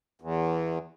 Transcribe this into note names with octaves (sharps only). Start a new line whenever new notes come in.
E2